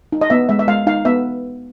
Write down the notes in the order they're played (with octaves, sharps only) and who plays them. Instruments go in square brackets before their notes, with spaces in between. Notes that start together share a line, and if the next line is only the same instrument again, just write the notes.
[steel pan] D#4
D#5
B3 E5
G#3 E5
E5
G#3 F5
D#4 F5
B3 E5